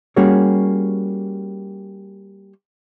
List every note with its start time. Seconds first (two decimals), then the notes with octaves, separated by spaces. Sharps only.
0.16 G3 A#3 C#4 F#4 G#4 C#5